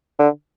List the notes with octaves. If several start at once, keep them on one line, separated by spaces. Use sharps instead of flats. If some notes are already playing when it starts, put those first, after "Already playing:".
D3